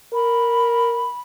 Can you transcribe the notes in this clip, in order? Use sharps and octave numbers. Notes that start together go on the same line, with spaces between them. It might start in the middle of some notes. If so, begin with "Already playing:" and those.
A#4 B5